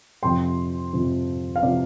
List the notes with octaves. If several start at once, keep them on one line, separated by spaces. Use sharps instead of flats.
F2 C3 F3 G5 C6
F2 C3 F3
F5
C3 F3 D5